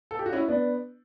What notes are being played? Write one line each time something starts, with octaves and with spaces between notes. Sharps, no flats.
A4
G4
F#4
C#4 E4
B3 D4